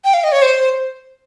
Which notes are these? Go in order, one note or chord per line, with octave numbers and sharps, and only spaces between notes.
G5
F5
D#5
C#5
C5